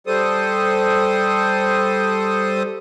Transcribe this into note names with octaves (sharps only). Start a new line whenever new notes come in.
G3 A4 C5 D#6